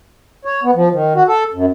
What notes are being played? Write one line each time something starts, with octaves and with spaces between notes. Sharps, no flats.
C#5
B3
F3
D#3
F#4
A4
F#2